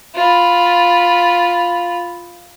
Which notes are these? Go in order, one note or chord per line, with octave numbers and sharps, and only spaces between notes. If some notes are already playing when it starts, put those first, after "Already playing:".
F4 B5